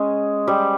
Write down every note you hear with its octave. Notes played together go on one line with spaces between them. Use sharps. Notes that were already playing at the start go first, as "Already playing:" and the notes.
Already playing: G#3 C#4
G3